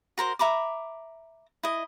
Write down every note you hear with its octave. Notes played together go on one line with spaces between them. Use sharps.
F#4 A#4 C5
E5 A#5 B5 D6
E4 D#5